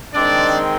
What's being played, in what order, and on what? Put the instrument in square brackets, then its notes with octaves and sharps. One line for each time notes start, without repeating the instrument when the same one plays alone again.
[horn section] D#3 G#3 C4 D4 D5